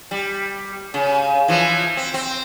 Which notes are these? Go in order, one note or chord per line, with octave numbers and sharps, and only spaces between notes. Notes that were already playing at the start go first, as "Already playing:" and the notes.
G3
C#3
E3 F3
C4
C4